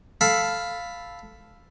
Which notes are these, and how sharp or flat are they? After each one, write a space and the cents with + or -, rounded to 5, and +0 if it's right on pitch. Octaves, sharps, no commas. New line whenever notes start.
A4 +0 F5 +0 B5 +5